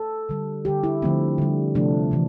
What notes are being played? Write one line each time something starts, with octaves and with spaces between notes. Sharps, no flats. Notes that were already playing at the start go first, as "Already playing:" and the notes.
Already playing: A4
D3 G3
D3 G3 G4
E4
D3 F3 A3 C4
D3 G3
C3 F3 A3 D4
C3 E3